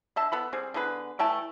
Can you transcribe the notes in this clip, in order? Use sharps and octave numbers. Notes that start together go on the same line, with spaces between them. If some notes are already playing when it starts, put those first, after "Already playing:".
D3 E5 A5
B3 A4 B5
G3 C4 G#4
D3 B3 G#4 B4
E3 A3 G5 A5